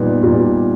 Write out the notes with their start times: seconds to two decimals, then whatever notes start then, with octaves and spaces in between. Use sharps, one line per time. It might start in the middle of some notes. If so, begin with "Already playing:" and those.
Already playing: A#2 G3 B3 D#4
0.23 A#2 G3 B3 D#4